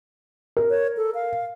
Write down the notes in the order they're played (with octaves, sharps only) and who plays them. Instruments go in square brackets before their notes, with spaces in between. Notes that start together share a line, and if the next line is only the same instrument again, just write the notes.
[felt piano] A#4
[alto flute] C#5
A4
F5